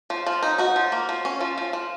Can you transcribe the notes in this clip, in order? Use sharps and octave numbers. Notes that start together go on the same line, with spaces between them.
F3
F3
D#4
D#4 F#4
F3
A#3
F3
C#4
F3
F3
F3